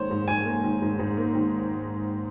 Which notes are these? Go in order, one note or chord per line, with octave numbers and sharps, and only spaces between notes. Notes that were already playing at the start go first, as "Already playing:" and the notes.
Already playing: G#2 D#3 A#3 C5 C#5
G#2
G#2 G#5
A#3
D#3
G#2
G#2
A#3
D#3